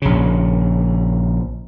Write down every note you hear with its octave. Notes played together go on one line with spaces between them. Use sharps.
A#1 C#3